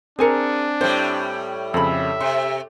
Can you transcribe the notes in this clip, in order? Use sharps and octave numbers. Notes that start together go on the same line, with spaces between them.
C4 D4 G#4 A#4 G#5 C#7
A2 G3 C5
F2 C#3 A4 E5 B5
C3 C6